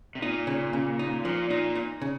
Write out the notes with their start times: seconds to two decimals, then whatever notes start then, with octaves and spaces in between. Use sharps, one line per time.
0.15 C3
0.22 A#2 D#4
0.47 C#3
0.73 C#3
0.99 D#4
1.25 A#2 F3
1.50 A#2 D#4
1.75 D#4
2.01 C#3